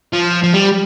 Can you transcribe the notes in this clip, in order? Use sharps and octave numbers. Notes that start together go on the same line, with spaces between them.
F3
F3
G3